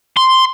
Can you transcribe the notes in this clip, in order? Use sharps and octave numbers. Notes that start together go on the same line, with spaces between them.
C6